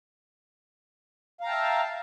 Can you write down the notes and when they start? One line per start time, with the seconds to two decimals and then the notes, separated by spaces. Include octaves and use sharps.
1.41 F5
1.43 A#5
1.46 G5
1.49 A5
1.51 E5